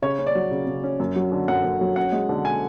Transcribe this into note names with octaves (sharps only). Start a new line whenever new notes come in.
C#3 C#5
C#4
D5
F#3
C#3
C#3
C#4
F#2
F#3
D3
F#2 F#5
F#2
F#3
C#4 F#5
G#3
D3
G#5